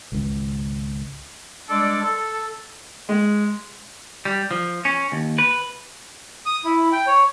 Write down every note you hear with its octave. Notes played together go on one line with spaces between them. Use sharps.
G#1 C#2
G3 G#3 D4 A4 D5
A4
G#3
G3
F3
C#4
D#2
B4
D#6
E4
G5
C#5